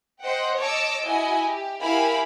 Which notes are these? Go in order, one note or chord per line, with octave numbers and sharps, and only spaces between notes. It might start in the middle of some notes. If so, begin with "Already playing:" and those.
C5 D#5 F#5 G5
C#5 D#5 A5 D6 E6
E4 F#4 D#5 G#5
G4
E4 G4 A#4 F5 G#5 B5